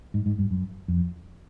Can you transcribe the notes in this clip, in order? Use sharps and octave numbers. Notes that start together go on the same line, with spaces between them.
G#2
G#2
G2
F#2
F2